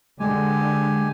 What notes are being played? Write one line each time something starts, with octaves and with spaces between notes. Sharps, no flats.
D3 G#3 G4 G#5